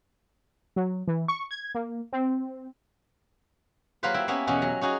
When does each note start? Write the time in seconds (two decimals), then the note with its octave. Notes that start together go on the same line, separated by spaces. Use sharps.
0.76 F#3
1.08 E3
1.28 C#6
1.51 G#6
1.75 A#3
2.13 C4
4.03 F#3 A#3 F4 G4 B4 C5
4.14 E4 G5
4.28 A#3 B3 C#4 E4
4.47 E2 B2 C#4 F#4 G4
4.62 F#3 A#5
4.81 C#4 D#4 F#4 G#4